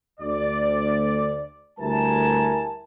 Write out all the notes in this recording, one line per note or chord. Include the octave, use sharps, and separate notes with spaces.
D2 D5
D2 G3 E4 A#4 G#5 A5